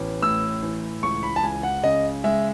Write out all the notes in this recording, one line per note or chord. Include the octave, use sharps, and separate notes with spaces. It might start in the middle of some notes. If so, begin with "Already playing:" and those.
Already playing: A1 B3
A2 E6
E3
C#2 C#6
B5
A5
C#2 G#5
F#5
C#3 D#5
G#3 E5